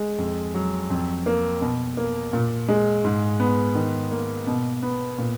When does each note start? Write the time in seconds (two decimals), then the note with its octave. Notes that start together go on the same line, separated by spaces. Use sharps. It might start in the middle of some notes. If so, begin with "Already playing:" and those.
Already playing: G#3
0.18 F2
0.54 F#3
0.90 F2
1.26 A#3
1.61 B2
1.97 A#3
2.33 A#2
2.68 G#3
3.04 G#2
3.40 B3
3.75 D#3
4.11 A#3
4.47 B2
4.82 B3
5.18 A#2